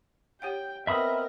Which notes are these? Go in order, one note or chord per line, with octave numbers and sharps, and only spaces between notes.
G4 C#5 F#5 G5
B3 C4 A#4 D#5 E5 B5 D#6